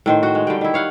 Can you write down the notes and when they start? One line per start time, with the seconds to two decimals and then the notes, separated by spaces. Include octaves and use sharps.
0.06 A2 D#3 C5
0.23 F#4 C5
0.35 G#3
0.47 D3 G3 G5
0.61 D#3 E4
0.74 C#5 F5 F#5